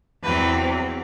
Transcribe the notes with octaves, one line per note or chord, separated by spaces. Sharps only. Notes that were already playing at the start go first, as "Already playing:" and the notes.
E2 C3 F#3 C4 B4